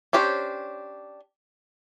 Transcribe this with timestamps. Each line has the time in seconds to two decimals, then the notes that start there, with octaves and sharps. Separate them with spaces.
0.13 C#4 D4 G4 C5 C#5